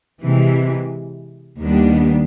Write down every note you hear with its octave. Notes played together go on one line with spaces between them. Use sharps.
C3 E3 G#3
D#2 D#3 G3 B3 D4